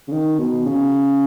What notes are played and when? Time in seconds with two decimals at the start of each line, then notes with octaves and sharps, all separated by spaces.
0.08 C#3
0.12 D#3
0.39 B2
0.66 C#3